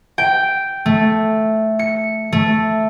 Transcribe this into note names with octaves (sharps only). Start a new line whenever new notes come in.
G5
A3
C#7
A3